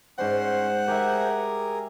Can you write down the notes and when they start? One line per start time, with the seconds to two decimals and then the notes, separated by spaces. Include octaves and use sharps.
0.18 G#2 C#4 C5 D5 F#5 C6
0.88 G4 G#4 A#4 E5